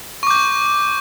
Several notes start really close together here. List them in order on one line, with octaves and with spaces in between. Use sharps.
C#6 D6 G6